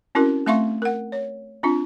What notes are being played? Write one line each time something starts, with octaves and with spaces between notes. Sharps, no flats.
C4 C#4 E4 F#4 A#4
A3 C4 E5 F5 C6 C#6
A#4 F#5
C#5
C4 D4 F4